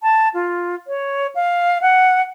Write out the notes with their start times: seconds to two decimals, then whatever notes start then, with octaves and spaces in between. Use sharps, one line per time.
0.02 A5
0.34 F4
0.87 C#5
1.35 F5
1.81 F#5